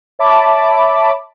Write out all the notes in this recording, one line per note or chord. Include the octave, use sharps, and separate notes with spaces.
C#5 E5 A5 B5 D6